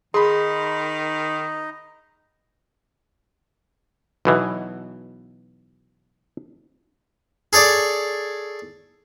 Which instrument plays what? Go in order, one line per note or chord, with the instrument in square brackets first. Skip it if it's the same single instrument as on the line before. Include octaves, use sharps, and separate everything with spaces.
[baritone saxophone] D#3 [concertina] D#4 D#5 [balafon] G#4 [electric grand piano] B5 C6
[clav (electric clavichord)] B1 B2 E3
[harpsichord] G#4 A4 C#5 D5